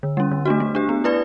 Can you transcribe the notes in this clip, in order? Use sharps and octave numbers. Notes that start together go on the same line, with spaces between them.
D3
G3 C#4
D3
A3 D4 F#4
A3
D4 G4
B3
E4 B4 D5